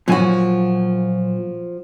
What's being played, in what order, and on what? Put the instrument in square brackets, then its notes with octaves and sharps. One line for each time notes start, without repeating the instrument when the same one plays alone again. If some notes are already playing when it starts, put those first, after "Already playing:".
[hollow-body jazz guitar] A#2 F#3 G#5 [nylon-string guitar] F3 F#4